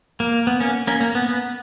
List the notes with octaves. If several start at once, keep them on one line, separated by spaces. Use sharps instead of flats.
A#3
B3
A#3 C#4
A#3 C#4
A#3
B3
B3